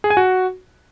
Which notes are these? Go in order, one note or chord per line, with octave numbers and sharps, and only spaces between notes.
G#4
G#5
F#4